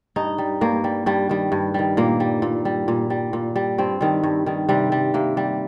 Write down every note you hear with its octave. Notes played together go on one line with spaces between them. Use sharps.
G2 D#4
G3
G2 A#3
G3
G2 G3
D#3 G3
G2
D#3 G3
A#2 A#3
G3
A#2
G3
A#2
G3
A#2
G3
G2 C4
D#3 G3
G2
D#3 G3
C3 G3
G3
C3 A#3
G3